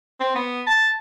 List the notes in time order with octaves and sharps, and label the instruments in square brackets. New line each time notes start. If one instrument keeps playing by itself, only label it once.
[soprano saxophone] C4
B3
A5